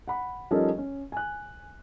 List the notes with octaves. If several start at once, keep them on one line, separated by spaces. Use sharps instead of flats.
F#5 B5
F3 G3 C#4 D#4 A4 A#4
C#4
G#5 F#6